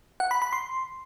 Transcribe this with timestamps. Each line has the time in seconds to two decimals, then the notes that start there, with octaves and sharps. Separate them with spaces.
0.20 F#5
0.31 B5
0.42 B5
0.53 C6